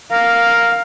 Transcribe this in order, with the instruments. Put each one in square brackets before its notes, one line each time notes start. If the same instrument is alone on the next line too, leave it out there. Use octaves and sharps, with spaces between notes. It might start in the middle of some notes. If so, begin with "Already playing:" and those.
[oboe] A#4 [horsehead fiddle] F5